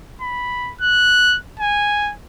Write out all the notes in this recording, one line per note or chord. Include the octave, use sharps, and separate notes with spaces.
B5
F#6
G#5